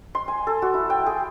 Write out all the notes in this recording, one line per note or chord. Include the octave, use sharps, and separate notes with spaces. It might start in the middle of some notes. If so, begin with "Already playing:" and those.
C6
G#5
A4
F#4
E4
G5
G#4